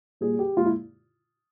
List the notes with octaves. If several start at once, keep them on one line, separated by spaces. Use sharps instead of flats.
A#2 G3 G#4
G4
A#2 G#3 F4
E4